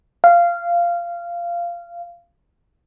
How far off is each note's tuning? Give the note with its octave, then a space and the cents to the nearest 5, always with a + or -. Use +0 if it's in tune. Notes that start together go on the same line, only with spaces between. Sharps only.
F5 -15